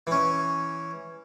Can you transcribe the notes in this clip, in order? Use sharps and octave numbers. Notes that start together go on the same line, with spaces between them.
E3 C#4